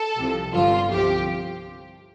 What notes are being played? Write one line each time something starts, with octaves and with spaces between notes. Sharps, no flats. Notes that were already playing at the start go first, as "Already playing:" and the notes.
Already playing: A4
C2 C3 F3
G1 G2 D3 F3 F4
C2 C3 F3 G4